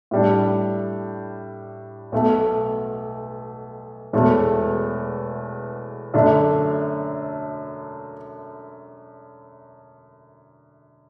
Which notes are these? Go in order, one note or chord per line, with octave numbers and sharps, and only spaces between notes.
A2 G3 D4
B1 B2 A3
E1 E2 B2 A3
F#2 D3 A3 D4